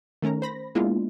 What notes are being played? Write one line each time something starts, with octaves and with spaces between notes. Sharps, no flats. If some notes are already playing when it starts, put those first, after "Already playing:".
D#3 A3 C#4 A#4 A#5
C5 B5 A#6
G#3 A#3 B3 D4 E4 F4